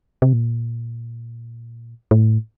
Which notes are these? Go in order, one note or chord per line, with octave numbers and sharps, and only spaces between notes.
C3
A#2
A2